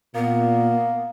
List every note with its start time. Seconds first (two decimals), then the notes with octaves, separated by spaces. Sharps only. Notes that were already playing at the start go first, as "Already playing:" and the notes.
0.15 A#2 A#3 B3